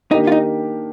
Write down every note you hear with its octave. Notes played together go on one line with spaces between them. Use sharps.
D#3 A#3 D4 D#4 G4
F4
D#4